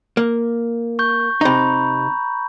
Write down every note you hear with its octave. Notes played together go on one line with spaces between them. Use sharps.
A#3
C#6 G6
C3 D#4 A#5 B5